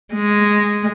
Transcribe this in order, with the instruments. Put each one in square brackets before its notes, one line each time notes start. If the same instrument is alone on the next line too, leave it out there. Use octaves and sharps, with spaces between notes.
[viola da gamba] G#3